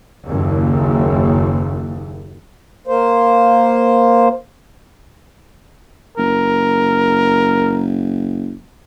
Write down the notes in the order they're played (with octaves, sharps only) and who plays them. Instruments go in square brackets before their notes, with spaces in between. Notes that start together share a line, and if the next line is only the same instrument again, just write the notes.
[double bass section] F#1 D#2
[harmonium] A#3 C5
[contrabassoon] F#1 [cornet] A#4